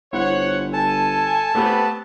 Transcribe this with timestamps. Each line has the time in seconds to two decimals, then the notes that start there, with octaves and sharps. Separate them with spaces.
0.13 G1 E4 C5 C#5 F#5
0.73 A4 G#5 A5
1.55 A3 B3 C4 G4 B4